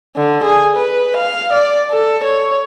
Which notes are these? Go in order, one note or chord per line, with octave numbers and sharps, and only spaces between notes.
D3
G#4
B4
F5
D5
A4
C#5